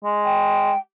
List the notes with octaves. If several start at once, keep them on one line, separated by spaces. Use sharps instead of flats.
G#3
G5